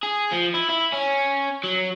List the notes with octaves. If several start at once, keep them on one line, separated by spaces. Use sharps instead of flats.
G#4
F3
E4
E4
C#4
F#3